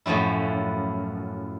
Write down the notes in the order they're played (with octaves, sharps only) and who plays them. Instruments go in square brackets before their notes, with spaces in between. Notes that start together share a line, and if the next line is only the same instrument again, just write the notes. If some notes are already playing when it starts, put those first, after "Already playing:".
[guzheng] F#2 A2 F3 F#3 E4